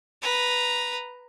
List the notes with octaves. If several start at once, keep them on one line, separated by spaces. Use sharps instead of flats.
B4 A#5